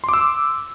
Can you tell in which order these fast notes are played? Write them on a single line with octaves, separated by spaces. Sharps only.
C6 D6 E6